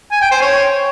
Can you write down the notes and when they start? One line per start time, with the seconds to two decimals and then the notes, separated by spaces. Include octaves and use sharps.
0.12 G#5
0.22 G5
0.31 C5
0.41 C#5